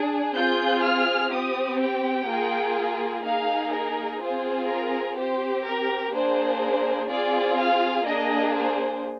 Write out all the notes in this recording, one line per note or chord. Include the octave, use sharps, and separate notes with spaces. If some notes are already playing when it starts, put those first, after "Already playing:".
Already playing: D4 G#4
C4 F4 G#4 G6
F6
C4 G4 D#6
G5
A#3 F4 G#4
A#3 D#4 G#4 F5
A#4
C4 F4 G#4 C5
A#4
C4 G4 C5
A#4
A#3 D4 G#4 C5
C4 F4 G#4 D5
F5
A#3 D4 G#4 D#5
C5